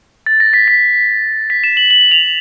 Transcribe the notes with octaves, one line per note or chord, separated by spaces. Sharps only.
A6
A#6
B6
B6
B6
E7
F#7
F#7
F7